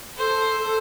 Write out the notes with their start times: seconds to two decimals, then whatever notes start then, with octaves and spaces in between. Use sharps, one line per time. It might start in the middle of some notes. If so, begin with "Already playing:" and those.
0.17 A4 C5
0.58 A4